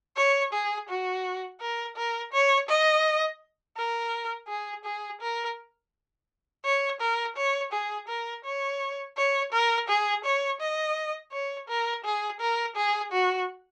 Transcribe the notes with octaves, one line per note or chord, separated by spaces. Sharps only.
C#5
G#4
F#4
A#4
A#4
C#5
D#5
A#4
G#4
G#4
A#4
C#5
A#4
C#5
G#4
A#4
C#5
C#5
A#4
G#4
C#5
D#5
C#5
A#4
G#4
A#4
G#4
F#4